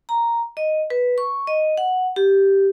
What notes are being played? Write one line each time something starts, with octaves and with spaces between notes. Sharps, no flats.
A#5
D#5
B4
C#6
D#5
F#5
G4